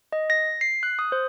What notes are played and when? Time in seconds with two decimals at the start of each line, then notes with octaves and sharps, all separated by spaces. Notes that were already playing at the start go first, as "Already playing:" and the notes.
0.12 D#5
0.30 A#6
0.61 C7
0.83 F#6
0.99 D#6
1.12 C5